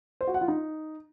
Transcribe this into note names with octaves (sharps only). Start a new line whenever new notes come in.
C5
F#4
F#5
F4
D#4